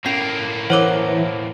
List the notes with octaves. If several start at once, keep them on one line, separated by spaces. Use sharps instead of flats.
A2 A#3 C#4 C7
E3 A#4 C5 C#5 F#5 D6